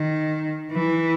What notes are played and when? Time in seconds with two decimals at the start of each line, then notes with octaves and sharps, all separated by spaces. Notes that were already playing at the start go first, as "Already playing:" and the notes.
Already playing: D#3
0.72 E3